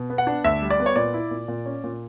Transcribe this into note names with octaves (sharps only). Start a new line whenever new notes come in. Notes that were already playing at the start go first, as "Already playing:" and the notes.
Already playing: B2
B3
F#5
D4
D2 E5
G3
D5
B3
C#5
A#2 D5
E4
A#2
A#2
C#4
A#2